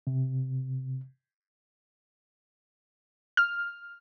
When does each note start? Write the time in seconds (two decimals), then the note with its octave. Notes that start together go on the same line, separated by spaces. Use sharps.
0.07 C3
3.37 F6